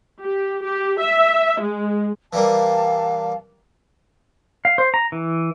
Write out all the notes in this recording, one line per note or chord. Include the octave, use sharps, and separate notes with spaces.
G4
G4
E5
G#3
E3 G3 A#3 F5 A5
F5
C5
A#5
E3